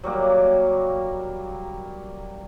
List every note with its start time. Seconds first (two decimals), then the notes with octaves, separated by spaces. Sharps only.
0.04 F#3 G3 A#3